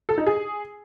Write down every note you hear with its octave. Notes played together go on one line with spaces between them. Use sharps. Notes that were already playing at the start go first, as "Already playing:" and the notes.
A4
D#4
G#4